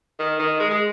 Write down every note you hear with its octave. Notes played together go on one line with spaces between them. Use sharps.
D#3
D#3
G#3
G#3